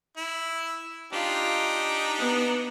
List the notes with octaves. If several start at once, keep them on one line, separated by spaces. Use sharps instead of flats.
E4
D4 D#4 F4 G4
B3